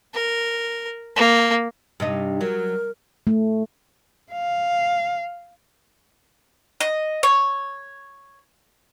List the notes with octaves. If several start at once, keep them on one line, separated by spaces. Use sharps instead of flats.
A#4
A#3
G2 C3 D#4
F#3 A#4
A3
F5
D#5
C#5